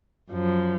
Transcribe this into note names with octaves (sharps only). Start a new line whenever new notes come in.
F#2 F3